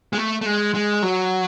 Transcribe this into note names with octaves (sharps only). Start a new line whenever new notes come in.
G#3
A3
A3
G#3
G#3
F#3